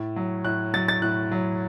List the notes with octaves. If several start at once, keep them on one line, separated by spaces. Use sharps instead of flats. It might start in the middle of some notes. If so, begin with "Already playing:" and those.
Already playing: A2
F#3
A2 F#6
F#3 A6
A6
A2 F#6
F#3